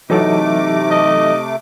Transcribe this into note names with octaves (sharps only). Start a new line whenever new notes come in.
C3 E3 F#3 A3 D#4 A4 D6
D#5